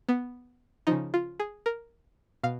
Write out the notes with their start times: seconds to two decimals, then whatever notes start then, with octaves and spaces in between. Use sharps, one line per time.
0.09 B3
0.87 C#3 F3 D#4
1.14 F4
1.40 G#4
1.66 A#4
2.44 B2 F5